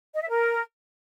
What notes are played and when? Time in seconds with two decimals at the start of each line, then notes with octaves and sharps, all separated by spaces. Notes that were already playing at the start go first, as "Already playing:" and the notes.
0.14 D#5
0.22 E5
0.29 A#4